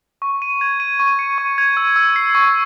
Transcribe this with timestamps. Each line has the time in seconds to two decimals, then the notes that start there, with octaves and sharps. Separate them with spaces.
0.22 C#6
0.42 D#7
0.61 G#6
0.80 D#7
1.00 C#6
1.19 C#7
1.38 C#6
1.58 G#6
1.77 E6
1.96 E6
2.16 C7
2.35 C#6